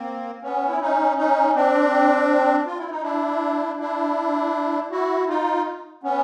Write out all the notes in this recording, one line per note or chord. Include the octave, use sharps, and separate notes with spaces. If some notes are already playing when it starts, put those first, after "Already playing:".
Already playing: A#3 C4
B3 C#4
E4
C#4 D#4
C#4 D#4
C4 D4
F4
E4
D#4
D4 E4
D4 E4
E4 F#4
D#4 F4
B3 C#4